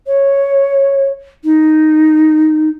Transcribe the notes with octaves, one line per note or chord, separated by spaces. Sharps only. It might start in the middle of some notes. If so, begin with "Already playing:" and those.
C#5
D#4